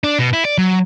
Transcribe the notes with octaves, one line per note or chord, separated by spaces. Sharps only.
D4
B2
E4
D5
F#3